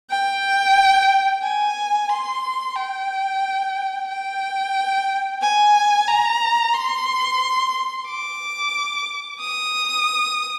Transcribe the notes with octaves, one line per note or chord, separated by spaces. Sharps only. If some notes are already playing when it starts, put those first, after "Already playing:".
G5
G#5
C6
G5
G5
G#5
A#5
C6
D6
D#6